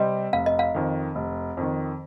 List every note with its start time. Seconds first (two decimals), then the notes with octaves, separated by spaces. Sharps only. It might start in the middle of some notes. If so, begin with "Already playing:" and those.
Already playing: C3 G3 C4 D#5
0.33 F1 F5
0.46 D#5
0.59 F5
0.74 F2 D#3
1.15 F1
1.57 F2 D#3